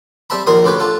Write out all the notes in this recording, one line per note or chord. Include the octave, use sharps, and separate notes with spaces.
G3 C4 E5 A5 B5
A#1 D#2 A#4 G#5 C6 D#6
D2 C#4 G4 B4 D6
F4 A4 F#5